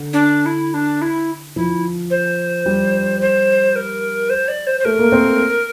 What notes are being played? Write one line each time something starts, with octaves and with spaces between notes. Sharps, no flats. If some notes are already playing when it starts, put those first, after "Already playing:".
Already playing: D3
D4
E4
D4
E4
F3 E4
C5
G3
C5
A#4
C5
D5
C5
C5
A3 A#4
A#3
C4
A#3